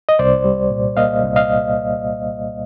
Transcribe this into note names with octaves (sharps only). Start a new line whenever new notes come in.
D#5
C2 C5 D5
G3
A#2
A#3 D#5 F5
C2
D#5 F5